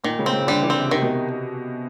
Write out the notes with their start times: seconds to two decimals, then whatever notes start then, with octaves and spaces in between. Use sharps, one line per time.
0.04 A#2 D#3
0.19 C#3
0.26 C4
0.33 C#3
0.47 D3 G3
0.62 E3
0.70 C4
0.77 C3
0.91 C3 D#3
1.02 B2